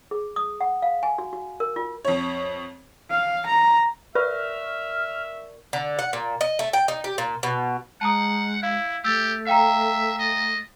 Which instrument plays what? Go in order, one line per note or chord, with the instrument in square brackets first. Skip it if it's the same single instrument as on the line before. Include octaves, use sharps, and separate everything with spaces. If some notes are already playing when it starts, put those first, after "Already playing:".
[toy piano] G#4
D#6
F#5
F5
G#5
F#4
F#4
A#4
F4
[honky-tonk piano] F2 C#5
[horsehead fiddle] F5
A#5
[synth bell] A#4 D5 C#6 [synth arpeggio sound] B4 [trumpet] E5 [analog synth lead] F6
[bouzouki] D3
F#5
A#2
D#5
A3
G5
D#4
G4
A#2
B2
[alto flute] G#3 [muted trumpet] F#5 [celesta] A5 A#5 D#6
[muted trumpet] E4 [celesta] F5
[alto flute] A3 [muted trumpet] G4 [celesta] E6 A6
[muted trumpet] E5 [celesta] F5 G5 A#5
[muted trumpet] D#5